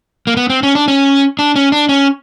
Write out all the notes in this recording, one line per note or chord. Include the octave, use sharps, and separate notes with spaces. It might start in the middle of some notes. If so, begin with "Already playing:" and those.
A#3
B3
C4
C#4
D4
C#4
D4
C#4
D4
C#4